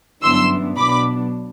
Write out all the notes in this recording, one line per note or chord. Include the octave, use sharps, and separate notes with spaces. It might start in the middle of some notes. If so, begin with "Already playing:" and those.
G1 F#2 E3 B3 D4 C6 E6
B1 B2 F#3 B3 D4 B5 D6